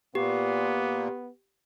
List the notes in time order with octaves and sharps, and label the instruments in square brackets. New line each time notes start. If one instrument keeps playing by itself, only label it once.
[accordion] A#2 A#3 [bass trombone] B3 [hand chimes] G4